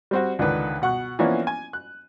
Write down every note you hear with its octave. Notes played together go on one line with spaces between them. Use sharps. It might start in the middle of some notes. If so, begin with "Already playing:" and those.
G3 C4 F#4
C#2 D3 D#3 B4
B2 F#5 C#6 F#6
E3 F3 A#3 B3 C#4 D4
G#5
F#6